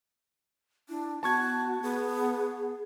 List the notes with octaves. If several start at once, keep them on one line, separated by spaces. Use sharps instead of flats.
D4 E4
B3 F#4 A5 C#6 G#6
B3 G#4